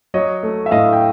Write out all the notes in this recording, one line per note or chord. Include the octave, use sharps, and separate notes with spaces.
F#3 C#5 D#5
A3
E5
A2 D#5 F5
G5